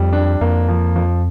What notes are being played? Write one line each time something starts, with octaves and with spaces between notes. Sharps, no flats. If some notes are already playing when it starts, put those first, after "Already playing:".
Already playing: F2 G3
D4
F2 A#3
F3
F3